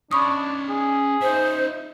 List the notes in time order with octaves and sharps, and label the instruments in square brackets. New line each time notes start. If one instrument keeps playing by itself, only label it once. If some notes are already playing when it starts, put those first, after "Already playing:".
[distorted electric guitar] C#4 D5 [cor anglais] D4 [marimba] B5 C#6 D#6
[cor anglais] G#4
[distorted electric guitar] D#4 E5 [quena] C5